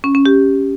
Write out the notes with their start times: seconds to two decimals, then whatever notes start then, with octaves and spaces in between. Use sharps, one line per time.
0.04 C#4
0.15 C#4
0.26 G4